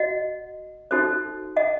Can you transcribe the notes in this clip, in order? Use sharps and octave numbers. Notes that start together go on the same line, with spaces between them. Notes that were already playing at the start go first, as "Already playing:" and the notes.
Already playing: F#4 D#5 F#5
D#4 F#4 A4 C5
D#5 F#5